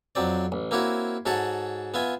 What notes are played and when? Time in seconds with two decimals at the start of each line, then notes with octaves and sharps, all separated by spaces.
0.15 F2 F#3 C4 D5
0.52 A1
0.71 A#3 C4 E4 F#4 C#5
1.26 G#2 F#4 A4 C#5 F#5 A5
1.94 B3 F4 E5 G#5